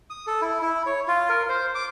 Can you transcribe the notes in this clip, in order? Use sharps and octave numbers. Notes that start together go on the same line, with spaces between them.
D#6
A4
E4
E4
C#5
F4
A#4
C5
D6